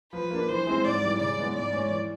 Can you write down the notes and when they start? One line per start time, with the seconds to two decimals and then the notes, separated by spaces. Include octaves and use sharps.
0.13 F3 B4
0.31 A#3 D4
0.49 E3 C5
0.67 G#3 C4 E4 G#4
0.84 G#2 D5
1.02 E3 G3
1.19 C#3 D5
1.38 E3 G#3 B3
1.55 G#2 D5
1.72 E3 G#3 C#4
1.90 E3